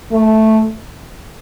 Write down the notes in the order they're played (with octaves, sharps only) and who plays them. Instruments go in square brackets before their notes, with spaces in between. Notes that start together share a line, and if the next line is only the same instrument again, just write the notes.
[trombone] A3